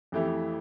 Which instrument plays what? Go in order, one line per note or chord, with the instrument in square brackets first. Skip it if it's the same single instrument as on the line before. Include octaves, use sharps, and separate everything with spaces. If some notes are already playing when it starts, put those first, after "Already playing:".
[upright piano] F2 E3 A3 E4 G4